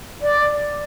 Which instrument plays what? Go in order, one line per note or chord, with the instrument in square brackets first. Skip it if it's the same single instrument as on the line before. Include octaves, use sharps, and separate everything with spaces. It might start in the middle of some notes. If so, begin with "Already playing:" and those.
[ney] D5